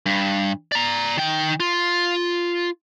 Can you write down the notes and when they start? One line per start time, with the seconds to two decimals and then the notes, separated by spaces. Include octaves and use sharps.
0.06 G2
0.72 D5 A#5
1.17 D#3 G5
1.60 F4